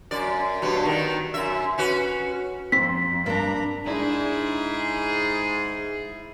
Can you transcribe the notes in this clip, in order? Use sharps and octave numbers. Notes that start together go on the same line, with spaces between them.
F#2 D5
G2 B2 F#3
D#3 B3
F#2 E5
C#4 F#4 B4
F2 C4 C6 B6
G2 A#3 D4 A#5 B5
G#2 D4 E4 G#4 D5